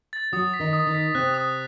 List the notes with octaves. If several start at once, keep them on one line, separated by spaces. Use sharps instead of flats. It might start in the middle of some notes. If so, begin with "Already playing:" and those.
A6
F#3 F#4 D#6
B6
D#3 D#4
D#6
D#3 D#4
B6
C3 C4 F#6
D#6